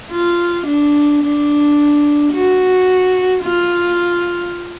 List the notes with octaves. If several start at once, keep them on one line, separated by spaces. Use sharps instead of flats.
F4
D4
D4
F#4
F4